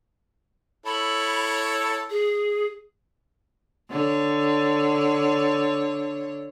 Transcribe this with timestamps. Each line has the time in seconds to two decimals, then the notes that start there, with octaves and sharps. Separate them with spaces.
0.86 E4 A4 C#5 B5
2.10 G#4
3.89 D3 C#5